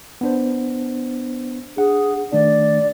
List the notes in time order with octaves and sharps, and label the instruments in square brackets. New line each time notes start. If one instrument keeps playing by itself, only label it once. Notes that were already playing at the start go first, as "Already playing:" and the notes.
[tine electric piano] B3 D4 C5
[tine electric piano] D4 F#5 [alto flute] G#4
[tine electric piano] D#3 A3 D4 [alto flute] D5